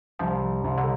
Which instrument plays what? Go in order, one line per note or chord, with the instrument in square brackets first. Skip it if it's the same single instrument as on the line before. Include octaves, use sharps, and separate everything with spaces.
[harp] C2 [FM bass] F3
[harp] C2
[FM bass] D3